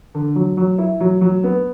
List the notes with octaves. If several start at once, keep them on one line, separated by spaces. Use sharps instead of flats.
D3
F#3
F#3
E4
F#3
F#3
B3